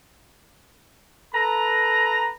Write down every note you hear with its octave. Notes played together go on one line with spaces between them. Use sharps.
A4 B4 A#5